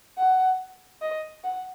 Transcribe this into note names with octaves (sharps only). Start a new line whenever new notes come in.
F#5
D#5
F#5